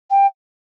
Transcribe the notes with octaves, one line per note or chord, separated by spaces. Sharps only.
G5